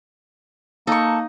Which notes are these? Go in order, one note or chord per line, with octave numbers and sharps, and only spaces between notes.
A#3 D#4 A4 C#6